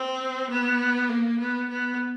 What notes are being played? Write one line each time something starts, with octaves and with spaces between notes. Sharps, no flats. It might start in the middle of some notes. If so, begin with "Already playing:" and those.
Already playing: C4
B3
A#3
B3
B3